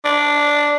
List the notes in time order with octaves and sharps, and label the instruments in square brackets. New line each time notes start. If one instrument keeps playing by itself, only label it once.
[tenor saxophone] D4